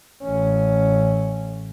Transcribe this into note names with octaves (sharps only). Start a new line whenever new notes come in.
A1 C#4